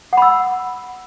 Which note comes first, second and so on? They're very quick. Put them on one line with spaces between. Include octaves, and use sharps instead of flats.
F#5 B5 E6